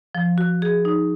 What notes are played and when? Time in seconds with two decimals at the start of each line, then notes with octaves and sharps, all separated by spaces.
0.15 F3
0.38 F#4
0.62 G#4
0.85 D#4